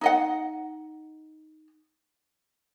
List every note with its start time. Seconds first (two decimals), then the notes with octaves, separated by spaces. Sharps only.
0.01 D#4 D#5 F#5